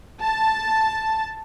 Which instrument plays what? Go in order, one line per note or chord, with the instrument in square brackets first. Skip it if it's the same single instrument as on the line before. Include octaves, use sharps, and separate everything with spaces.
[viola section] A5